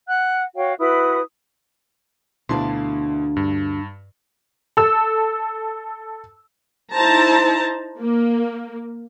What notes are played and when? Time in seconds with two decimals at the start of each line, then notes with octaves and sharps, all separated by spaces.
0.08 F#5 F#6
0.56 F#4 C#5 F5 G5
0.79 E4 F#4 B4 D#6
2.49 D2 B2 D4 E4 F5 C6
3.36 G2
4.77 A4 E6
6.94 D#4 E4 C5 A5 A#5
8.00 A#3